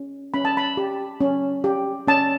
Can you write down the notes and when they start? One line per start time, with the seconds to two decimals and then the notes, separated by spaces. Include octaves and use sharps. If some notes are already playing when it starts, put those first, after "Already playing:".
Already playing: C#4
0.34 C#4 B5
0.45 A5
0.57 B5
0.77 G4
1.21 C#4
1.64 G4
2.07 C#4 A5